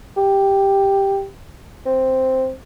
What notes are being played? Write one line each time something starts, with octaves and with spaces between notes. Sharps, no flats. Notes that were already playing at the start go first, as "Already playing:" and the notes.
G4
C4